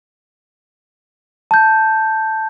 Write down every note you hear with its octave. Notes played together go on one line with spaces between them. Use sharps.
A5 G6